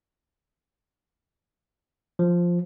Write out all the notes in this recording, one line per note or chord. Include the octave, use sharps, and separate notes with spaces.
F3